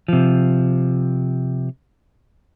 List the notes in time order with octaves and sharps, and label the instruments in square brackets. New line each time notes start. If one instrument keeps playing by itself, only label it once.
[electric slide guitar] C3 F3